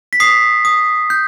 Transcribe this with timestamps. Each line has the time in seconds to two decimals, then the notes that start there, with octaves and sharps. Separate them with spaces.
0.13 B6
0.20 D#6 C7
0.65 D#6
1.10 G6